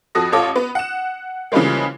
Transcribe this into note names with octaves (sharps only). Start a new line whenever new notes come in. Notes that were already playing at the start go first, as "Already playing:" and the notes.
F2 F#4 A4 D#6 A#6
A1 F4 A4 C#5 D6
B3
F#5 E7
C#3 E3 F3 G3 G#3 A#3